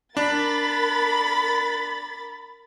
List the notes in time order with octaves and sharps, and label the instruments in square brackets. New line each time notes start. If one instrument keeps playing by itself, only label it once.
[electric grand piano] D4 [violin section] A#4 B5 A6